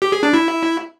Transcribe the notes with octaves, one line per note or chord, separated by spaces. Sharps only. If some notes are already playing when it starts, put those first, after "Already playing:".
G4
G#4
D4
E4